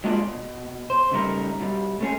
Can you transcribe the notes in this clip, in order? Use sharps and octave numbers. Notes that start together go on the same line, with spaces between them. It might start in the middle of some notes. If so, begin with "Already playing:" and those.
F#3 G#3 A#3 D4 F4 G#4
B2
C5
C#3 F#3 G3 A3 D#4 A#4
B2 G3
A3 C#4 G#4